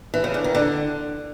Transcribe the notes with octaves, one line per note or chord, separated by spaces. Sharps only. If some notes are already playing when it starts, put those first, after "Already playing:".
E3
C#3
D3
D#3
D3